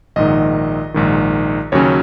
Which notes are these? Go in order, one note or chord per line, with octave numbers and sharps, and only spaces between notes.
A#1 G#2 D#3 D#5
A#1 G#2 D#3
D#2 C#3 F#3 C#4 C#5